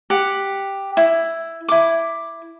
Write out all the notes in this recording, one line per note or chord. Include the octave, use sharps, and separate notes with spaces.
G4 F#5
E4
E4 D6